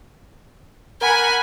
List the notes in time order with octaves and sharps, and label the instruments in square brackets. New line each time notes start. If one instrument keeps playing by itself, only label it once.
[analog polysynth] A#4 F#5 B5 [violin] G#5